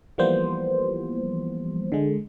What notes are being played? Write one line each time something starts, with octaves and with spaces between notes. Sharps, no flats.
E3 F3 G3 A#3 B3 C5
D3 G#3